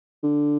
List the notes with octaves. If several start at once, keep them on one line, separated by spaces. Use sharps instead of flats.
D3